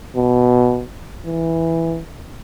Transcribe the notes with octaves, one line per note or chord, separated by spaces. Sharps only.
B2
E3